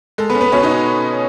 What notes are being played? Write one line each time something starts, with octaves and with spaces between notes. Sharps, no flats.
G#3 A4
B3 B4
C#4
B3 B4
B2 C#4 C#5
D#4 D#5